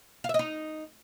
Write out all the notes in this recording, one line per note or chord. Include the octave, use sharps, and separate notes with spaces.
F5
E5
D#5
D#4